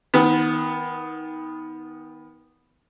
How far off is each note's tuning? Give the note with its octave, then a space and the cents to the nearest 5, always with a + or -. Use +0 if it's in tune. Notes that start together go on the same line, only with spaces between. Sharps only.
D#3 +30 B3 +0